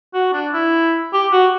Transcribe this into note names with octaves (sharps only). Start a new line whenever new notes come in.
F#4
D4
E4
G4
F#4